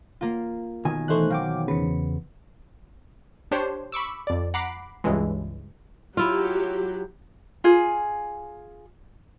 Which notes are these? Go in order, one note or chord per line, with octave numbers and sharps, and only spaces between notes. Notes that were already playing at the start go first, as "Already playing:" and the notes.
A#3 F4
B1 D#3 G#5
E3 A3 D#4 C5 C#6 F#6
F#3 F5 G5 D6
E2 C#3 B4 C#7
D4 G4 C5 C#5
B5 C#6 D6 E6
F2 D5
F#5 A#5 B5 D6 C7 D7
C#2 G2 C#3 E3 G#3
F#3 E4 F4 G4
F4 G#4